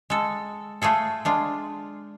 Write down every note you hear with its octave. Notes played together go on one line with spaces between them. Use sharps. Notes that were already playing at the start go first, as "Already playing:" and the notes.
G#3 A4
A3 F4 G#4 A4
G#3 D4 F4